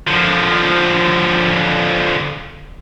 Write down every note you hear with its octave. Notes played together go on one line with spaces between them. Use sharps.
D3 F3